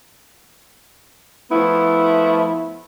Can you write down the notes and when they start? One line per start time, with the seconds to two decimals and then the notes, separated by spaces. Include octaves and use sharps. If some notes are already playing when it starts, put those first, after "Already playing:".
1.52 F3 A3 B3 E4